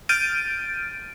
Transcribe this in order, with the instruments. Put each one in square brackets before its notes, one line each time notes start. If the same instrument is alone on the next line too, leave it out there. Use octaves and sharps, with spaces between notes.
[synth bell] F6 G6 A6 D7 D#7